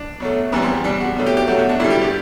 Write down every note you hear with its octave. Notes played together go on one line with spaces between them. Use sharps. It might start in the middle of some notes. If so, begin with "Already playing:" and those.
Already playing: D4
B2 F#3 A3
F#2 E3 G3 B3
C4
B2 G3 D4
F#4
B2 F#3 A3
G4
G4
B2 F#3 A3 F#4
F#4
D4
G2 D3 G3 E4
G4
G4